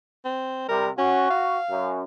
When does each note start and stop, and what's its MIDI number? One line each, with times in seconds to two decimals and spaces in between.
0.25 0.66 60
0.69 0.89 48
0.69 0.89 55
0.69 0.89 70
0.98 1.29 61
0.98 1.58 66
1.30 1.93 77
1.71 2.02 42